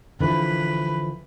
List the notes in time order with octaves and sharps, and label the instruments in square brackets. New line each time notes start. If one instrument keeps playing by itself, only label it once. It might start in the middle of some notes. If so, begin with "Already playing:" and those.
[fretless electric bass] D3 E3 F3 [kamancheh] B4